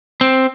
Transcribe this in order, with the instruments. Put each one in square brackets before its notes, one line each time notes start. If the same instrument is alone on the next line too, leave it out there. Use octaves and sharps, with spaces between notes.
[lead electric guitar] C4